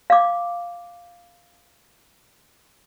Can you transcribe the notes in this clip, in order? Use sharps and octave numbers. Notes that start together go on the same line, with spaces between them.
F5 D6